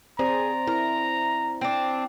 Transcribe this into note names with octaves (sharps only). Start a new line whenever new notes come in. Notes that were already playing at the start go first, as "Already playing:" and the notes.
C4 G#4 C5 D5 A#5
E4 A#4
C4 D4